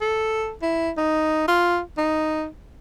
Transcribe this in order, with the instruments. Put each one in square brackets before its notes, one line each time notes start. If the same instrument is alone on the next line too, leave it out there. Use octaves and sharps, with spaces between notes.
[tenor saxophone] A4
E4
D#4
F4
D#4